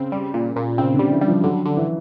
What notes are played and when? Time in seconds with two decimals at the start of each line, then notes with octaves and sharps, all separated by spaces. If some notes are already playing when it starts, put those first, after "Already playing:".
Already playing: C#3 C4
0.12 G3
0.34 A#2
0.56 A#2
0.78 C#3 C4
0.94 D3
0.99 G3
1.11 E3
1.21 G3
1.28 F3
1.44 D3 F#3
1.66 D3
1.77 E3